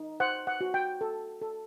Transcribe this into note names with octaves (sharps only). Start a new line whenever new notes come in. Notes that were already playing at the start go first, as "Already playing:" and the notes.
Already playing: D#4
C5 F#5
F#5
F#4
G5
A4
A4